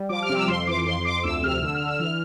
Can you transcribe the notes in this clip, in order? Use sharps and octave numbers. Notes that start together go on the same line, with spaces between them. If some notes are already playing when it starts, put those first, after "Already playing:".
Already playing: G3
F3 D6
F6
C3
E6
F2 C6
E3 D6
F2 C6
F2 D6
D2 E6
C3 F6
D3 E6
F6
D3
E6
E3 F6